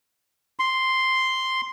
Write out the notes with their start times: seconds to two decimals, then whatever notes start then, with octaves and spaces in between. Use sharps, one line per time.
0.59 C6